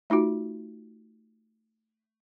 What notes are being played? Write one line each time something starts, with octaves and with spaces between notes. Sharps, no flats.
A3 D#4 F4 F#4